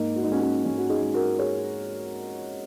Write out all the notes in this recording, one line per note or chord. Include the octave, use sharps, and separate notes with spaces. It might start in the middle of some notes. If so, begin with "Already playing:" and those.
Already playing: G#2 A#3 D#4
F#4
D#4
G#3 C#4 F#4
C#4 F#4
G#2 C#4
F#4
D#4 G#4
G#3
F#4 A#4
G#4 C#5